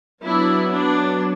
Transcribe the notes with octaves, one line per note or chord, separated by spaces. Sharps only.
F#3 B3 D4 E4
D4